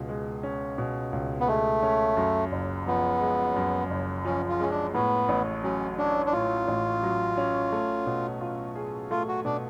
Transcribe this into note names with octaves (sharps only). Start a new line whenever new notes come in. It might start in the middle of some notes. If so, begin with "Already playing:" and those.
Already playing: C#2 B2
G#3
C#4
B2
C#2
B3
G#3 A3
C#4
F#2
F#1
F3 B3
G#3
F#2
F#1
F3 C#4
F4
G#3 C#4
D4
A2 B3
A1
F#3 C#4
C#4 D4
D4
A2 F4
A1
F#3
C#4
A3
B2
F4
G#4
A3 F4
F#4
B2 D4